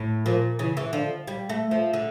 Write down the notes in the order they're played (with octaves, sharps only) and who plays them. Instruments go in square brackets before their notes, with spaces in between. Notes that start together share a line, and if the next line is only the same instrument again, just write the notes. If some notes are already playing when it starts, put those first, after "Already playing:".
Already playing: [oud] A2
[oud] A#2 [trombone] F3
[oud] C#3 [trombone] E3
[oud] E3
[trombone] D3 [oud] F3
[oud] G3
A3
F3
D3